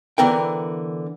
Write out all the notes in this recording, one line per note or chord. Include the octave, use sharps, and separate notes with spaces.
D3 E3 B3 A#4 G5